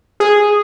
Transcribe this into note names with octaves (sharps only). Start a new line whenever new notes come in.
G#4